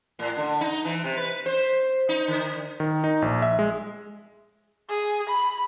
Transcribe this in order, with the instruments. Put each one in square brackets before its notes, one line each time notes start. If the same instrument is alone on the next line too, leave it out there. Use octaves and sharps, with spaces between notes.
[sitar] A2
D3
D#4
E3
C3
B4
C5
D#4
D3
[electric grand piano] D#3
D#4
A#1
E5
G#3
[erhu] G#4
B5